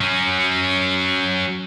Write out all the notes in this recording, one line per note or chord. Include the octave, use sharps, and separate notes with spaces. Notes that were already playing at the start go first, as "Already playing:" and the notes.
F#3 C#4